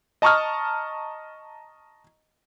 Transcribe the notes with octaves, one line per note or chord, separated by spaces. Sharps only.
D#5 A5 A#5 C#6 D#6 F6